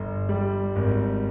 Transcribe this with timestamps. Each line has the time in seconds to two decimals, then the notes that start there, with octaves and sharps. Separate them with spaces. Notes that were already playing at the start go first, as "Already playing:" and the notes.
Already playing: G1
0.29 G3
0.76 G#1